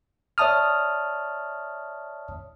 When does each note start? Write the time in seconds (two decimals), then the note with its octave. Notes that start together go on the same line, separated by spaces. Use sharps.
0.38 C#5 D5 E5 A5 D#6 F6